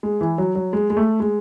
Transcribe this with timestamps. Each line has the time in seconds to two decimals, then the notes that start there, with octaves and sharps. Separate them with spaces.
0.03 G#3
0.21 E3
0.38 F#3
0.55 F#3
0.73 G#3
0.90 G#3
0.97 A3
1.20 G#3